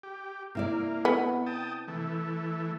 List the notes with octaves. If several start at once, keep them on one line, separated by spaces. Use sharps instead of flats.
G4
C3 A#3 E4 D5
B3
G5 A5 D#6
E3 A3